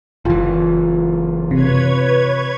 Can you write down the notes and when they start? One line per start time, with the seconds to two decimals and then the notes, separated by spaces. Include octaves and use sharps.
0.25 F#1 E3 F4
1.51 C3 B4 C#5 G#6